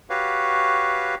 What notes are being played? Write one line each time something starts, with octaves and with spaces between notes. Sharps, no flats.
F#4 G4 B4 C#5 F5